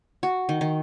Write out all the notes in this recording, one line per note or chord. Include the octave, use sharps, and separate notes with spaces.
F#4
D#3
D#3